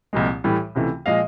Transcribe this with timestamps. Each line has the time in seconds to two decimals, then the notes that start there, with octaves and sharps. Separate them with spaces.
0.13 C2 A#2 F3 G#3
0.44 A2 E3 G3
0.75 C#2 C3 E3 A3
1.06 A#2 F3 G#3 D#5 F5